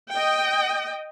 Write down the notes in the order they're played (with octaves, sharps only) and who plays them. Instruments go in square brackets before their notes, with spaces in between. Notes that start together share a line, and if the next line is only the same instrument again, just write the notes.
[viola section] D#5 G5